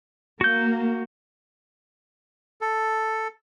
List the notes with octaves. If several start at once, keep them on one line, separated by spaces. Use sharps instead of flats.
A#3 F#4 G6
A4